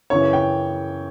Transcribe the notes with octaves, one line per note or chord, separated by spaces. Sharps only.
F#2 C#3 E3 C#5
G5